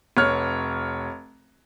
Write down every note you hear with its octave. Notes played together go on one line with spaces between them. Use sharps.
F1 C#5 F6